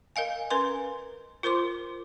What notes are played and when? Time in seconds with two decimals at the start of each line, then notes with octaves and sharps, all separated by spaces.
0.16 A#4 D#5 F5 G#5
0.50 C#4 A#4 B4 G#5 C6
1.43 F4 A#4 C5 C6 D6